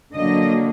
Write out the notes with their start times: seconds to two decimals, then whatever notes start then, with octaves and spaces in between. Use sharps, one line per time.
0.14 D3 F#3 A#3 D#5